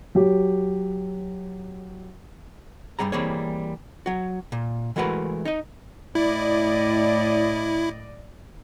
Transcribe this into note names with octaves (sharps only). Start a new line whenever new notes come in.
F#3 G4
G2 A#2 G3 G#4 A#5
E3 G3 A#3 C4 G#4 C#5
F#3 F#4
A#2
E3 G#3 A3 F#4 A#4 B4
D#4 D#5
A2 E4 D5 D#5